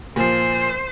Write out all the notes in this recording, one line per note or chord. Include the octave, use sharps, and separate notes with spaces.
A#2 F3 C5